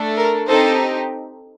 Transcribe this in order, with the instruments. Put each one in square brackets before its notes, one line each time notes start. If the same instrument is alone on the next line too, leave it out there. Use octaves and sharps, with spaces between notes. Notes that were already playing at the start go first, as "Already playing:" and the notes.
Already playing: [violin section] A3 D4 A4
A#4
C4 D#4 G4 A4 C5